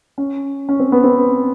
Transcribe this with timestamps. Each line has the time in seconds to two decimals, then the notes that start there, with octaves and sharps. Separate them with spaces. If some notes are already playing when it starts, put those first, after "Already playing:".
0.18 C#4
0.69 C#4
0.80 C4
0.92 B3
1.04 C4